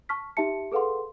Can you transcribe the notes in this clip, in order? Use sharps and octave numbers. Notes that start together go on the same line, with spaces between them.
A5 C#6 F6 B6
D#4 G4 E5 A5 C#7
G#4 A4 B4 F5 F#5 C6